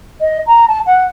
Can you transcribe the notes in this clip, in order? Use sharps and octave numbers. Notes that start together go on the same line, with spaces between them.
D#5
A#5
A5
F#5